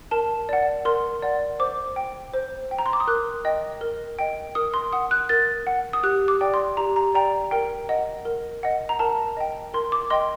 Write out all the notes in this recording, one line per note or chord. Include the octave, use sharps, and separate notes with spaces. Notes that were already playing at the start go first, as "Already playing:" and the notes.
A#4 A5
D5 F#5
A#4 C6
D5 F#5
C5 D6
G5
C5
G5
A#5
C6
D6
D#6
A#4 F#6
D#5 G5
A#4
D#5 G5
A#4 D#6
C6
F#5 D#6
F#6
A#4 A6
F#5
D#6
G4 F#6
D6
D5 G5
C6
G4 A#5
A#5
D5 G5 A#5
A#4 G5
D#5 F#5
A#4
D#5 F#5
A#5
A#4 A5
D#5 G5
A#4 C6
D6
D#5 G5 C6